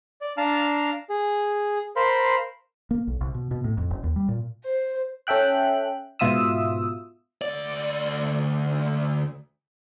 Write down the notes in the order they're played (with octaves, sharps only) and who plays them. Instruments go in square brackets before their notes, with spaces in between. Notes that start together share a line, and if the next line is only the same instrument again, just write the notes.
[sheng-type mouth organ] D5
D4 F5 A5 A#5 F6
G#4
A#4 C5 F5 B5 C6
[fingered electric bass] A#3
B1
C2
B2
B2
A2
F2
F#1
D#2
G3
A#2
[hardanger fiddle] C5
[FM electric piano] C#4 A4 E5 G5 F#6
G#2 B2 F4 E5 D#6 E6
[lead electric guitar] D2 D5